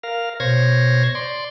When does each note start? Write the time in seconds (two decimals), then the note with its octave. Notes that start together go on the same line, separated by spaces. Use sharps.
0.03 A#4 F5
0.40 B2 C5 C#5 G#6 A#6
1.15 D5 C6